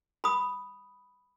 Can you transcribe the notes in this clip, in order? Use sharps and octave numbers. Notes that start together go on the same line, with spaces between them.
B5 D#6